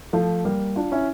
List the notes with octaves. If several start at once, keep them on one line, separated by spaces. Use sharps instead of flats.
F3 A3
G3 A#3
D4 F4
C#4 E4